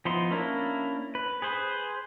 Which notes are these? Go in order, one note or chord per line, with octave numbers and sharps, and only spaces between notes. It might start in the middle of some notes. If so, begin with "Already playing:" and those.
F3 B3 D#4 E4 C6
A#3 C#4 D4 E4 A#4
B4
G#4 B4 C5